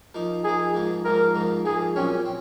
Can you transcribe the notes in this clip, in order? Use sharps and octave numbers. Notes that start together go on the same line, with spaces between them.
F3 A#3 D#4
F3 A#3 D#4 G#4
G#2 F3 A#3
G#2 F3 A#3 A#4
G#2 F3 A#3
G#2 F3 A#3 G#4
A#2 F#3 C4 C#4
C4